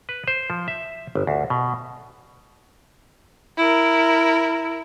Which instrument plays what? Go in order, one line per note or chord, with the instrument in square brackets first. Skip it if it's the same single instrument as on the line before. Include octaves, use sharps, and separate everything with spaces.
[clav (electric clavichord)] B4
C5
F3
E5
G1
D2
B2
[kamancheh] E4 A#4